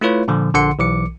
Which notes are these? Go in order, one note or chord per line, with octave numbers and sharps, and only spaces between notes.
A3 E4 F4 B4 C#5
A#2 D3 F3
A#1 D3 F#5 C6 C#7
B1 E3 D6 C#7